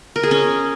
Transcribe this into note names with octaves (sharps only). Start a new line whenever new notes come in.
A#4
G#4
C#4